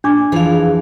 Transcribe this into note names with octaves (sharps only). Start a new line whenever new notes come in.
A#2 D4 D6
F2 E3 F3 G#4 F5